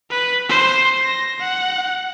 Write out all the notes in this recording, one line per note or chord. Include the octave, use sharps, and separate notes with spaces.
B4
C5
A#6
F#5